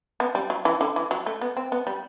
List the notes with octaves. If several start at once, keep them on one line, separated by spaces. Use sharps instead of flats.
B3
G3
F#3
E3
D3
E3
F#3
A3
B3
C4
B3
G3